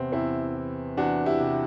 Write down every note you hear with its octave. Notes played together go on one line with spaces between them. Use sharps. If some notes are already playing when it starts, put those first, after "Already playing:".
Already playing: E2 C3 B3 C4
E2 C4 E4
E3
E2 D4 F#4
E4 G4
C3